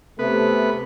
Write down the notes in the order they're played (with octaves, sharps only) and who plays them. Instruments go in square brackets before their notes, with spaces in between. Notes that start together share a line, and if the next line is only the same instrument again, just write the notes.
[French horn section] C3 A3 [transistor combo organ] B3 B4